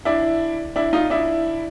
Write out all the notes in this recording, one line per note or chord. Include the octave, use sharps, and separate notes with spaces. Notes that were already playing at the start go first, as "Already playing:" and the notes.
D4 E4
D4 E4
D#4 F4
D4 E4